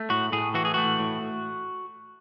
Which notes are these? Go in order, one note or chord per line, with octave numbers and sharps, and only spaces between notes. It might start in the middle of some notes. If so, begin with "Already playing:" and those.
Already playing: A3
A2 F#4
A2 G#4
E3 F#4
G#4
A3 F#4
A2